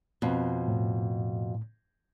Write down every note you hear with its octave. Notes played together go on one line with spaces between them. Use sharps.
F2 B2
A2